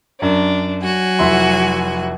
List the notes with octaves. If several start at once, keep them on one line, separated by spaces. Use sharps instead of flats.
F#2 D4
F#3 F#4 G#5
F1 E4 C6